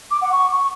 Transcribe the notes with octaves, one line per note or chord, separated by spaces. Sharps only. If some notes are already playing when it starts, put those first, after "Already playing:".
D6
F#5
C#6